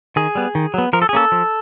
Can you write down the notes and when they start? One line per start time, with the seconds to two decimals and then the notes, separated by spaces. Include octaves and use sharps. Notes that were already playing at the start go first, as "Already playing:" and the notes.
0.16 D#3 G#4
0.35 G3 B3
0.55 D#3
0.74 F#3 B3
0.93 F3 A#4
1.02 A4
1.09 G#4
1.13 A#3 C#4 A4
1.32 F3